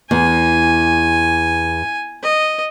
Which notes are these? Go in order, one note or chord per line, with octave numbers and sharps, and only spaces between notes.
E2 G#5
D#5